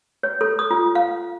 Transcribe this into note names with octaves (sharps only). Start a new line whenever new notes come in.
C#5
A4
D#6
F4
F5